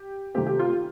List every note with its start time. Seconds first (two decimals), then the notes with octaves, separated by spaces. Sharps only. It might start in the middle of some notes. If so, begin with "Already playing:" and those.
Already playing: G4
0.34 C3 D#3 A3 C4 G4
0.46 G4
0.59 F4